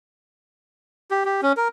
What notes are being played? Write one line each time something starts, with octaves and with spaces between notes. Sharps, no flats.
G4
G4
C#4
A#4